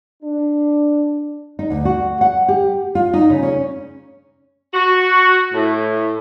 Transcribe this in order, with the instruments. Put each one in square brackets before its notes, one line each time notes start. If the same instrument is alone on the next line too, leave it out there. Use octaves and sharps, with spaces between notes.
[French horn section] D4
[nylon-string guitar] D#4
D2
F#4
F#5
G4
F4
D#4
C#3
C#4
[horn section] F#4
A2